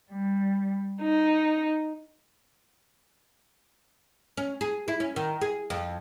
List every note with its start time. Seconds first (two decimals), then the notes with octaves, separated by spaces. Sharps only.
0.10 G3
1.01 D#4
4.37 C#4
4.61 G#4
4.88 E4
5.00 C#4
5.16 D#3
5.41 G#4
5.70 F2